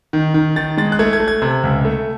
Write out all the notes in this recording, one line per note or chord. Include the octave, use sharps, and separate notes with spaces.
D#3
D#3
D#3 A6
G#3 A6
F#6
A3 G#6
G#6
A3
G#6
C3
C#2
A3